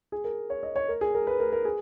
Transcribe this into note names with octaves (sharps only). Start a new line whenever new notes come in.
G#4
A#4
C#5
D#5
C#5
A#4
G#4
A#4
B4
A#4
A#4
G#4